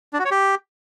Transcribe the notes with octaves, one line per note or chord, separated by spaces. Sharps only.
D4
F#4
C#5
G4